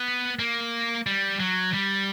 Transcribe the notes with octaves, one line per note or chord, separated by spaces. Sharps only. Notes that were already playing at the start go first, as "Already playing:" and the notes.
Already playing: B3
A#3
G3
F#3
G3